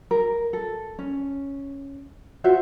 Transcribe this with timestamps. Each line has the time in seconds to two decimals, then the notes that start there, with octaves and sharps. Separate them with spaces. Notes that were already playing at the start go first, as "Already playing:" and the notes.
0.11 A#4
0.53 A4
0.99 C#4
2.44 F4 F#4 C5 E5